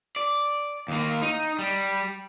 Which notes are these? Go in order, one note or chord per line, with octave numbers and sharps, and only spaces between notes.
D5
D#2 A#3
D#4
G3